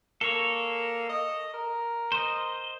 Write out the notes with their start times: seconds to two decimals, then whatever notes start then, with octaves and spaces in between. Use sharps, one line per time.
0.21 A#3 A4 C#5
1.09 D#5
1.54 A#4
2.12 C5 D#5